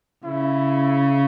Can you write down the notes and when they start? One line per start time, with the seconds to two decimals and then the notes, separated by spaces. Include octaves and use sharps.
0.24 C#3 E4